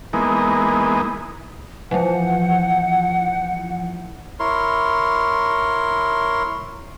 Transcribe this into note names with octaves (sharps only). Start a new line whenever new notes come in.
E3 G#3 A#3 B3 D#4
E3 F3 F#5
E4 A#4 C#5 C6